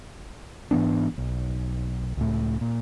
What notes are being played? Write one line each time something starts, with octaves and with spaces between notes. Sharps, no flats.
G#2 E3 B3 D4
B1
C#2 A2
A#2